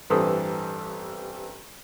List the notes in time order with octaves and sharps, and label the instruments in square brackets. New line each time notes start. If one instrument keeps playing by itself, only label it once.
[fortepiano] A1 G2 E3 C4 A4 D#6